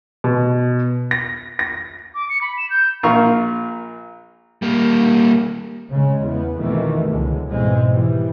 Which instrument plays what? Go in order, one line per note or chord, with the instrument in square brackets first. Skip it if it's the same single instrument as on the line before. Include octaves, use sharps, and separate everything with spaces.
[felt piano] B2
A#6
A#6
[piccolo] D6
C#7
B5
E7
G6
[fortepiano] A#1 A#2 A#4 F5 C#6
[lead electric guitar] G3 A#3
[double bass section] C#3 G#3
E2 B3
F2 B2 D#3 E3 A3
C#2 D3 G#3
G#2 B2 E3 G#3 C4
E3 G3